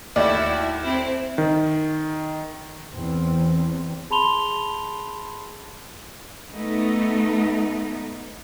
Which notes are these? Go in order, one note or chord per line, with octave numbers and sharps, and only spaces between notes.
D#2 A3 E4 F#4 D5
C4 E4
D#3
E2 C4
G#4 A5 B5 C6 F7 G7
A3 B3 D#4